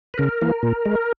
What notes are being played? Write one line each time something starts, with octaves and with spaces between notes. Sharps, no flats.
B4
C#3 A#4
E3 A#3
A#2
G#3